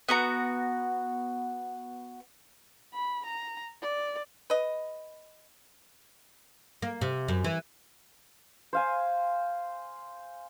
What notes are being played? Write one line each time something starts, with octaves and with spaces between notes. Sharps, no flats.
B3 F#4 A#5
B5
A#5
D5
B4 D#5
A#3
C3
F#2
E3
C5 F5 G#5